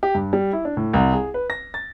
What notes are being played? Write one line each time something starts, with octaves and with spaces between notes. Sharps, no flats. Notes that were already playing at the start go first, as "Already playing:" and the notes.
G4
G2
G3
E4
D4
A2
C2
G#4
B4
A#6
A6